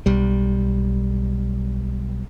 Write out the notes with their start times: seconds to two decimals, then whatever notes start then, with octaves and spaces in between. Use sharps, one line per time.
0.06 B1 G3